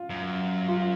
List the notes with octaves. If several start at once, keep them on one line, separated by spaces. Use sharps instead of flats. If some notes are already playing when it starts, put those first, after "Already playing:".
Already playing: F4
F#2
F4